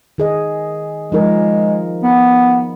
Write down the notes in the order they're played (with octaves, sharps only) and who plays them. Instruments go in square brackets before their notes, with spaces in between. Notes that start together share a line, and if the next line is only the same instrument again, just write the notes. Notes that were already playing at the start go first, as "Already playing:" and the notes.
[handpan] D#3 G#4 D#5
[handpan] F3 D#4 A#4 [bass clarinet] G#3
[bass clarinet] B3